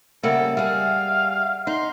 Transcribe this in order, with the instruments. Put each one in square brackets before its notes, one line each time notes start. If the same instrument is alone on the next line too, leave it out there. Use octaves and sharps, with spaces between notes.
[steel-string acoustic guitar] C#3 G3 A#3 [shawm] A4 [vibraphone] E5 F#5
[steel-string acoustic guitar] G3 G#4 [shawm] F5
[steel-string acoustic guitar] D#4 [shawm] C6